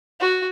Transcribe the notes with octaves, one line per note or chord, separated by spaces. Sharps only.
F#4